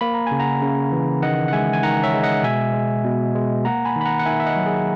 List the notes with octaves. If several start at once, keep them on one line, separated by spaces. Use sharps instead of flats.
A#3 B5
A#5
C#3 G#5
F#5 A#5
C#3
E3
D#3 D#5 F#5
F#5
G#3 E5 G#5
G#5
D#3 F#5 A#5
C#5 E5
G#3
D#5 F#5
B2 E5 G#5
G#3
B2
G#3
A#3 F#5 A#5
G#5 B5
D#3
B5
F#5 A#5
F#5
D#3 E5 G#5
E5
D#5 F#5
F#3
G#4